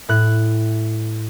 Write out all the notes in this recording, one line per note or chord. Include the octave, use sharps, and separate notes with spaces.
A2 F#6